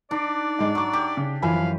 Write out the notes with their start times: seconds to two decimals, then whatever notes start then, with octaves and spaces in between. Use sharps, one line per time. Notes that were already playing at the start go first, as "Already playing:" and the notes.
0.11 D4 D#4 D5 B6 D7
0.59 G#2 G#3
0.75 F#3 C#6 D6
0.93 G4 D6
1.17 C#3
1.42 F#2 E3 F3 F5 G#5 B5